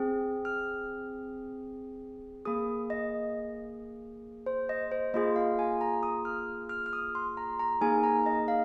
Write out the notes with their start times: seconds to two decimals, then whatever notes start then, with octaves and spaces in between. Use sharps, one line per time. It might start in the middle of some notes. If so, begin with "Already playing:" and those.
Already playing: C4 G#4
0.45 F6
2.45 A#3 G#4 D#6
2.90 D#5
4.46 C5
4.69 D#5
4.92 C5
5.14 A#3 F4 G#4 D#5
5.36 F5
5.59 G#5
5.81 A#5
6.03 D#6
6.25 F6
6.69 F6
6.86 F6
6.93 D#6
7.15 C6
7.37 A#5
7.59 A#5
7.81 A#3 D#4 G#4 G#5
8.03 A#5
8.26 D#5
8.48 F5